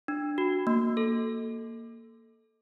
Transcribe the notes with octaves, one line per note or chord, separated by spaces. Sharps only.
D4
F#4
A#3
A4